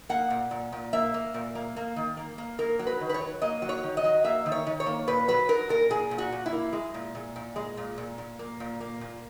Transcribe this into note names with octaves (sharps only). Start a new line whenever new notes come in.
A#3 F#5
A#2
A#2
A#2
A#3 E5
A#3
A#2
A#3
A#3
D#3
A#3
A#3
A#3 A#4
F#3
B4
D#3
B4
C#5
F#3
A#3 D#5
F#3
C#5
D#3
D#5
F#3
A#3 E5
D#3
C#5
D#3
C#5
A#3
A#2 B4
F#3 B4
F#3 A#4
A#2 A#4
A#2 G#4
A#2
F#4
A#2
E4
A#3
G#3
A#2
A#2
A#2
G#3
A#2
A#2
A#2
A#3
A#2
A#3
A#2